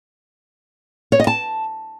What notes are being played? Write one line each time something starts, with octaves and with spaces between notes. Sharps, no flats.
C#5
D#5
A5